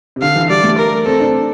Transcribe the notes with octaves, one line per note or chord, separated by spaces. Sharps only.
C3
D3 F5
E3
G3 D5
A3
A#4
C4 A4
D4